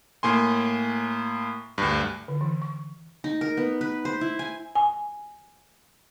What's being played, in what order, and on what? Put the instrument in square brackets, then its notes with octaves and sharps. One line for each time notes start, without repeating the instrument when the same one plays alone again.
[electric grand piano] A2 A#3 G#5 C6
D2 G2
[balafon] D3
E3
C#6
[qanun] D#4
A#4
B3
B4
C5
E4
G#5
[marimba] G#5